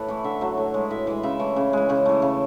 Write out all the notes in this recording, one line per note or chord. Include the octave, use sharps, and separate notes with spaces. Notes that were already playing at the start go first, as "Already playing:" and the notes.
Already playing: A2 A4 B4
E3 A3
D3 E5
F#3 A3
A2
G#3
A2 E5
E3 G#3
C#3 E5
E3 A3
C#3
E3 G#3
C#3 C#5
E3 A3
C#3